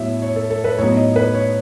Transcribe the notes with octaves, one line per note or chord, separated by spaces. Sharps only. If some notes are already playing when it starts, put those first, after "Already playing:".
Already playing: A2 F#3 B3 E4 C#5 E5
C#5
A4
A4
B4
A2 F#3 B3 D#4 C#5
D#5
B4
C#5